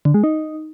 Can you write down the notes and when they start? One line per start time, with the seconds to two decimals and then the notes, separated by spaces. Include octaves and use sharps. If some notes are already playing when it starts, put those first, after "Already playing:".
0.05 D3
0.14 G#3
0.24 D#4